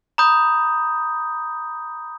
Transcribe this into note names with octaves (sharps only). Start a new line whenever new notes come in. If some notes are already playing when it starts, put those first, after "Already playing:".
A#5 B5 D#6 G6